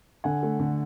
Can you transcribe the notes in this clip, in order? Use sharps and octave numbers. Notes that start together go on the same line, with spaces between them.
D3 F#5 G#5
A3
D3